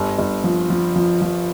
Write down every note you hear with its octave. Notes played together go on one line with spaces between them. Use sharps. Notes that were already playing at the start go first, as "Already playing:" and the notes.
Already playing: G1
G1
F3
F3
F3
F3